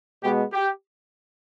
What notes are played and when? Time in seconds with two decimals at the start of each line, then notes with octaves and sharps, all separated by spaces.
0.23 B2 G#3 B3 G4
0.53 G4